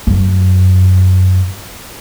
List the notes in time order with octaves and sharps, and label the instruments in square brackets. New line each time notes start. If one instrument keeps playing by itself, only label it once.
[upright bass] F#2